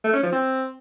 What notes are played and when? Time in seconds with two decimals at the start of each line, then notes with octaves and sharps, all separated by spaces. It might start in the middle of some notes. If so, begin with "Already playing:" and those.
0.04 A3
0.13 C#4
0.23 F3
0.32 C4